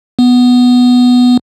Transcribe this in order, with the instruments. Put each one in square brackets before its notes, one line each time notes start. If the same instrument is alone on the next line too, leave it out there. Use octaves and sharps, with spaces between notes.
[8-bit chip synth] B3